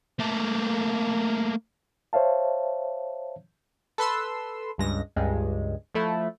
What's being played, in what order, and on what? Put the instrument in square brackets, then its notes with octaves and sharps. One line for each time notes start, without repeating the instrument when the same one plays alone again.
[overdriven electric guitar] A3 A#3
[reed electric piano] C5 C#5 E5 F5 A5
[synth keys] A4 B4 C6 E6
C#2 G2 G#3 A#6
C#2 G2 G#3
F3 A3 E4